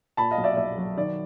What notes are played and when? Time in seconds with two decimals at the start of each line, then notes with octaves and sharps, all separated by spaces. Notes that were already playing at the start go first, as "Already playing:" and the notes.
0.17 A#2 A5 B5
0.31 D#5 F5
0.38 B1
0.44 D5 E5
0.57 B1 D5 E5
0.78 F#3
0.97 D#3 D5